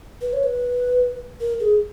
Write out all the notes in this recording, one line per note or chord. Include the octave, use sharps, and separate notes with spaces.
B4
C#5
B4
A#4
G#4